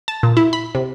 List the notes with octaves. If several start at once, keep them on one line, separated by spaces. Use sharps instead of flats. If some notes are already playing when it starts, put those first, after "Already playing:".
A5
A#2
E4
B5
C3